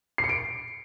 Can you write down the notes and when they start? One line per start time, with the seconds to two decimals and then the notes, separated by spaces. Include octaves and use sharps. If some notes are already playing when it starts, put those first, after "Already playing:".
0.18 C7
0.24 C#7
0.29 D7